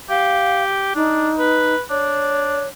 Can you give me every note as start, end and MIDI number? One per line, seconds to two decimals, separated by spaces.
0.10 0.92 67
0.10 0.64 77
0.95 1.31 62
0.95 1.75 63
1.39 1.81 71
1.90 2.65 62
1.90 2.68 73